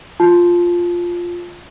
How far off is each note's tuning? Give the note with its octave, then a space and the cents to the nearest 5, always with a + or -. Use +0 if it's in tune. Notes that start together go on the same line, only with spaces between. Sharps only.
F4 +0 A5 -20